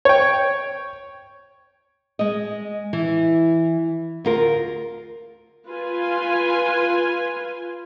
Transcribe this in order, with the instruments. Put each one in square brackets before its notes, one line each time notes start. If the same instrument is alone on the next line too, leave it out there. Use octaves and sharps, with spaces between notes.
[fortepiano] C#5 G5
[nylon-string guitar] G#3 D#5
E3
D2 F4 A#4
[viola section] F4 B4 G#5